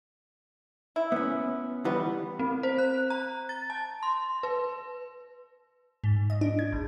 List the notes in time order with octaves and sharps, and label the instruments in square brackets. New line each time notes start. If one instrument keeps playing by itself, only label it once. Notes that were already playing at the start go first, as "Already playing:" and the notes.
[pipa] E4
[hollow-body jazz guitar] B3 C#4
[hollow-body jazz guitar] E3 G3 [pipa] B3
[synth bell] C4
C5
F#6
A#5
A6
A5
C6
B4
[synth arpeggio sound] G#2
D#5
D4
G#6
G#1